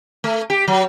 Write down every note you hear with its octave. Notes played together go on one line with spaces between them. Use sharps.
A3
G4
F#3